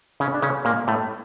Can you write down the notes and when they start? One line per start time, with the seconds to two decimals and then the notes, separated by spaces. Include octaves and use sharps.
0.20 C#3 C#4
0.34 D4
0.42 C#3 C#4
0.65 A#2 A#3
0.87 A2 A3